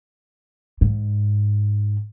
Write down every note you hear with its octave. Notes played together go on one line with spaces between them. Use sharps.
G#2